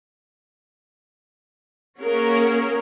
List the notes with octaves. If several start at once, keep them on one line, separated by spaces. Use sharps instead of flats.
A#3 C#4 F#4 G#4 A#4